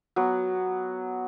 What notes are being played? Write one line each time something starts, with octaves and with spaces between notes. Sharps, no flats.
F#3 B3